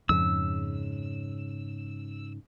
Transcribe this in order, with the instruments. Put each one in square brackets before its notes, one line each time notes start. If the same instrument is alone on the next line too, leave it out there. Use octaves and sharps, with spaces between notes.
[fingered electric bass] F2 [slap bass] G#2 C#3 [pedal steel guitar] E6